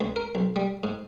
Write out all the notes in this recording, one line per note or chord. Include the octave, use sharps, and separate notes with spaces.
C#2
A#4
B1
G3
G#2